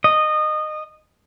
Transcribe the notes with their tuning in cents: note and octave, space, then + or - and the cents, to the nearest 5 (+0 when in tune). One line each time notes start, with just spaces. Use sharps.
D#5 -20